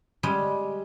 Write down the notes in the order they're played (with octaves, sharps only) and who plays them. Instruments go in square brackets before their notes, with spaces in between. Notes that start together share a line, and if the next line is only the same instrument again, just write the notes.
[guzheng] G3 G#3 C#4